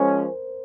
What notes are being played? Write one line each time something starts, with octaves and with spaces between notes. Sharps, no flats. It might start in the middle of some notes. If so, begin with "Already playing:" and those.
Already playing: F3 G#3 C#4 A#4 C5